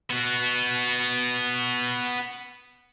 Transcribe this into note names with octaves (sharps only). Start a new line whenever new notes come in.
B3 F#4